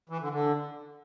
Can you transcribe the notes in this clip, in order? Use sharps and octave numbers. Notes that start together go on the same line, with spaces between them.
E3
D3
D3